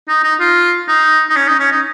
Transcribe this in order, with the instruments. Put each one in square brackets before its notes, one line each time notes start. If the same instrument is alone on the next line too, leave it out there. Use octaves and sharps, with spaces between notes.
[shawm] D#4
D#4
F4
D#4
D#4
C#4
D#4
C#4
D#4